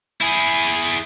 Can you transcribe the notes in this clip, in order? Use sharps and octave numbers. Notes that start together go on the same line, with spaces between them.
E4 G#4